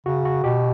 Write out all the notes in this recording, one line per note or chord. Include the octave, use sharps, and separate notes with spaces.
C#3 F#4
F#4
B2 G4